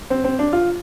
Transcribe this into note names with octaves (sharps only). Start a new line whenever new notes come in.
C4
C4
D4
F4